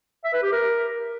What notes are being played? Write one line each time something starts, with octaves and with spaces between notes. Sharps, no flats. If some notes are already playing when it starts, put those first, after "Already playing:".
E5
B4
G4
A#4